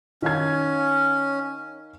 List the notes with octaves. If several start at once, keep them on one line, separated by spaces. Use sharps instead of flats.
D#3 C#4 F5 G#6